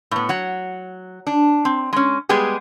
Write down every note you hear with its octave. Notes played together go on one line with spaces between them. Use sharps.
A2 B3
F#3 F#5
D4
C4
G#3 C#4
G3 G#3 B3 G4 G#4